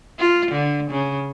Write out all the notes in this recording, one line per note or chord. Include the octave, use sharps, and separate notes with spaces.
F4
D3
C#3